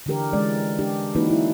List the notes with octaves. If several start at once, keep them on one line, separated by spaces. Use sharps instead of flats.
D3 E3 D4 G4 A#4
E3 G#3 C#4 D5
D4 G4
E3 A#3 C#4 D#4 F#4 B4
E4